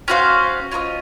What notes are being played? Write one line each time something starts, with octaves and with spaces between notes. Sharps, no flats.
C#4 F#4 C5 F5
C#4 F4 A#4 D#5